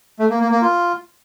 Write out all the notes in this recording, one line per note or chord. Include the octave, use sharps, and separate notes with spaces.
A3
A#3
A#3
A#3
F4